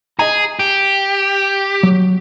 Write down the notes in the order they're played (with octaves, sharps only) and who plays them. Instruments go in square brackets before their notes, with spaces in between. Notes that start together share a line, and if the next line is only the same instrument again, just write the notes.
[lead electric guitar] G#4 [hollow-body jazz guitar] D#5 G#5 A#5
[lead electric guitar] G4
[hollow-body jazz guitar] F#3